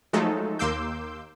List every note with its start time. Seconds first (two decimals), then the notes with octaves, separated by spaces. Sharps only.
0.13 F3 F#3 G#3 A3 D#4 A4
0.59 D#2 A#3 C6 D6 E6 G6